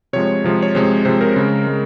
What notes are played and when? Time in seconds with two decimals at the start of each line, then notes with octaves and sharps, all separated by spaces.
0.13 C3 F3 G#3 C#5
0.44 C3 F3 G#3
0.62 C#5
0.75 C3 F3 G#3 C5
1.05 C3 F3 G#3 C5
1.21 A#4
1.36 C#3 G#3
1.67 G#3